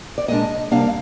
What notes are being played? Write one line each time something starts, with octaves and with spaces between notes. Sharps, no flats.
D5
A#2 G#3 D4 D#5
C3 G3 A#3 D4 F5